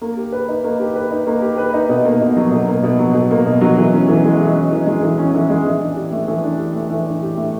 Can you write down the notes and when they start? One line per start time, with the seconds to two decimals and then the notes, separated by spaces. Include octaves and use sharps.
0.01 A#3
0.17 G4
0.32 B4
0.48 D#4
0.64 A#3
0.80 G4
0.96 B4
1.11 D#4
1.27 A#3
1.42 G4
1.58 B4
1.73 D#4
1.89 B2
2.05 A#3
2.21 B2
2.37 F#3
2.51 B2
2.68 A#3
2.83 B2
2.99 F#3
3.14 B2
3.31 A#3
3.46 B2
3.61 F#3
3.77 E3
3.93 C#4
4.09 E3
4.24 G#3
4.40 E3
4.56 C#4
4.71 E3
4.87 G#3
5.03 E3
5.18 C#4
5.34 E3
5.50 G#3
5.65 E3
5.81 D4
5.97 G4
6.12 A3
6.28 E3
6.44 D4
6.59 G4
6.76 A3
6.90 E3
7.07 D4
7.22 G4
7.37 A3